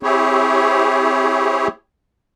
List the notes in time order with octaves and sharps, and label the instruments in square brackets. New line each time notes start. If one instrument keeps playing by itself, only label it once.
[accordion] C4 E4 G4 G#4 C#5